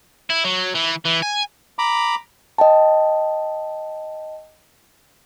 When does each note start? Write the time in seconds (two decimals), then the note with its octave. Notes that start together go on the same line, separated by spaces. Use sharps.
0.30 E4
0.45 F#3
0.75 E3
1.05 E3
1.23 G#5
1.79 A#5 B5 D6
2.58 D#5 G5 A5